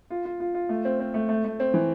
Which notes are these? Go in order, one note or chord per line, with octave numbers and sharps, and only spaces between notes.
F4
F4
F4
F4
A3
C4
C4
A3
A3
A3
C4
E3